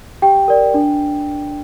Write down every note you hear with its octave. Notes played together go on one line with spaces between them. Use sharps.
G4 G5
A#4 D5
D4